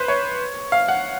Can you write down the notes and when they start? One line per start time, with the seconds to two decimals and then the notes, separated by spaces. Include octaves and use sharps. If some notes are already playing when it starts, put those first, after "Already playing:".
Already playing: B4 C5
0.08 C#5
0.72 F5
0.88 F#5